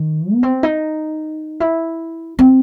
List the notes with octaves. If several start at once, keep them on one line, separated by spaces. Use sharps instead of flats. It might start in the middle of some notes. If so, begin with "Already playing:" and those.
Already playing: D#3
B3
C4
D#4
E4
C4